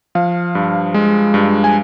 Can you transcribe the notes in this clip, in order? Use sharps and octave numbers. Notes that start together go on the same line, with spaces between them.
F3 F5
G2
G#3
G2
G#5